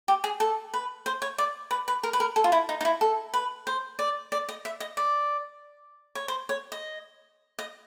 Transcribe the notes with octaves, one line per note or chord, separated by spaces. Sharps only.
G4
G#4
A4
B4
C5
C#5
D5
B4
B4
A#4
B4
A#4
A4
F4
E4
D#4
D#4
E4
A4
B4
C5
D5
D5
D#5
E5
D#5
D5
C#5
C5
C#5
D#5
D#5